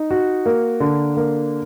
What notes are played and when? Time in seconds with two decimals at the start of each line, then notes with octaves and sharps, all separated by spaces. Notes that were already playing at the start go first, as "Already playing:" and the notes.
Already playing: D#4
0.11 F#4
0.46 A#3
0.80 D3
1.17 A#3